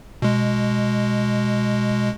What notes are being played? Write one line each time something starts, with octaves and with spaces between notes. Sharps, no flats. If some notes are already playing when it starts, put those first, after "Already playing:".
B2 G#3